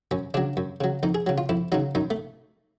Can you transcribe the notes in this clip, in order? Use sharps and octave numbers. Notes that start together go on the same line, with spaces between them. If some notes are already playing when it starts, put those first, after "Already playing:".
F#2 C#4
C#3 F#3 D4
F#2
C#3 F#3
F2 D#4
G#4
C#3 F#3
F4
F2 E4
C#3 F#3 D#4
F#2 D#4
A3